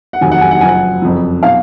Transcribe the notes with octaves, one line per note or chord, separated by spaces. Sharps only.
F#5
F1 D#2 D#3 F#3 G#5
F#5
G#5
F#5
F#1 F#2 F3 G#5
F#5
F#1 F2 F3
B2 F#3 F5